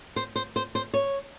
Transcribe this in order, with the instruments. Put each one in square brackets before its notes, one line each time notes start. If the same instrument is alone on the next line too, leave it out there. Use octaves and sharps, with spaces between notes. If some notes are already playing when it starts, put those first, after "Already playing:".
[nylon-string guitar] C5
C5
C5
C5
C#5